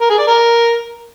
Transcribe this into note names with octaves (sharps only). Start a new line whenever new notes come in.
A#4
G#4
D5
A#4